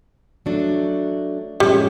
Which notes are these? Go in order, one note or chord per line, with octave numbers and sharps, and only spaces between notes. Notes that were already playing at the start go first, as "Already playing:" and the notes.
F#3 A3 D4
A2 F3 G3 G#3 C#4